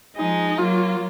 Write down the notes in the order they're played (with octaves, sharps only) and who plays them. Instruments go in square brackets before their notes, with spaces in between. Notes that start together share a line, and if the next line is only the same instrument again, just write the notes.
[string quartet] F3 G#3 [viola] D#4
[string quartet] F#3 A#3 [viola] F4